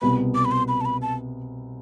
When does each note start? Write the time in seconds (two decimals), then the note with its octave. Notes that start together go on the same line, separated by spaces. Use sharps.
0.02 C2 B2 B3 B5
0.35 D6
0.45 B5
0.51 C6
0.68 B5
0.81 A5
0.85 B5
1.02 A5